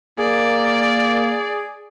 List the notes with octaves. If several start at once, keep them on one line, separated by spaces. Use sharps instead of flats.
A#3 G#4 D5